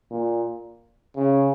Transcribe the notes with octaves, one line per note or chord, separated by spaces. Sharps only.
A#2
C#3